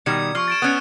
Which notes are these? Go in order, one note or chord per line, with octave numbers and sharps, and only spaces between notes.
B2 D#3 G3 G#6 C#7
F3 C#6 F6
A6 D7 E7
B3 C#4 D#6 F#6 C#7